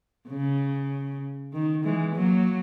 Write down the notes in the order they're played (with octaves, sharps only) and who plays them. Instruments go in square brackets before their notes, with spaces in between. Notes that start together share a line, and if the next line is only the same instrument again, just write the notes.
[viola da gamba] C#3
D#3
E3 G#3
F#3 A#3